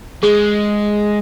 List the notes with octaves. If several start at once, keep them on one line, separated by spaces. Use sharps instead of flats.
G#3 G#4